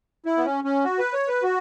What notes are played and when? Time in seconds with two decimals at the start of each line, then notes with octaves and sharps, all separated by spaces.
0.26 E4
0.37 B3
0.45 C#4
0.64 C#4
0.84 F#4
0.99 B4
1.13 C#5
1.28 B4
1.43 F#4